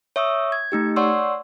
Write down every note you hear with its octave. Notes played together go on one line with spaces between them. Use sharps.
C#5 E5 C#6 D#6 E6
G#6
A3 D#4 G4
C#5 D5 F#5 C6 C#6 E6